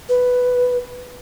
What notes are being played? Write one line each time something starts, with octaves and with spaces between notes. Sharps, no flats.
B4